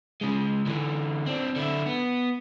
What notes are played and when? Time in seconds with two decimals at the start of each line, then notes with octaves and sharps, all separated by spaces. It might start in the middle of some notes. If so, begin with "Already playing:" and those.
0.21 C#3 G#3
0.67 D3 E3
1.27 C4 D4
1.57 D3 E4
1.86 B3